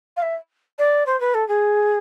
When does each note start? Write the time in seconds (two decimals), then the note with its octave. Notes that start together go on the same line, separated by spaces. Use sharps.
0.16 F5
0.22 E5
0.78 D5
1.06 C5
1.20 B4
1.34 A4
1.48 G#4